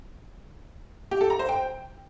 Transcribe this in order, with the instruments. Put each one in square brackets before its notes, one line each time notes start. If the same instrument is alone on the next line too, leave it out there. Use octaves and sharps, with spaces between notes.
[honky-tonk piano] G4
A4
A#5
C5
G5